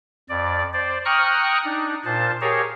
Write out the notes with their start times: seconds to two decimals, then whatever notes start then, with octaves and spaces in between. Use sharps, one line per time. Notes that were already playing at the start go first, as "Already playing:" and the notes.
0.29 F2 D5
0.73 C5 D5
1.05 G5 A#5 C#6 D#6 F6 F#6
1.64 D4 D#4
2.05 A#2 C5 A5
2.41 G4 G#4 A#4 C#5 F5